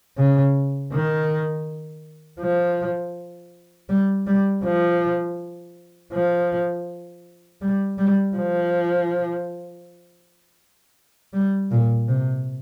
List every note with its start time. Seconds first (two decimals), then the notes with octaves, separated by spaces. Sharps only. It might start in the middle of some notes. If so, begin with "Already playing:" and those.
0.17 C#3
0.92 D#3
2.41 F3
3.89 G3
4.27 G3
4.64 F3
6.12 F3
7.62 G3
7.98 G3
8.36 F3
11.33 G3
11.71 A#2
12.08 C3